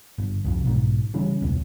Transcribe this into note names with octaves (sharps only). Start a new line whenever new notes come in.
G1
C2 F2
B1 G#2
C#3 E3 G3 C#4
E1 C#2